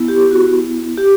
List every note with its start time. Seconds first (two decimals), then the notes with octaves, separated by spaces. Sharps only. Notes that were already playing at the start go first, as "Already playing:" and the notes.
Already playing: B3 E4
0.08 G4
0.31 F#4
0.98 G4